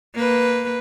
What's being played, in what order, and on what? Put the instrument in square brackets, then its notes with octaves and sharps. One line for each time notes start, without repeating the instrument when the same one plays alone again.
[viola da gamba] A#3 B4